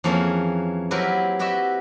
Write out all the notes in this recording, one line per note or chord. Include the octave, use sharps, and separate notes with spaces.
F2 E3 A#3 C#4 G#4 G#5
F#3 C4 E4 G4 A#4 B4
E4 F#4 G4 D#5 E5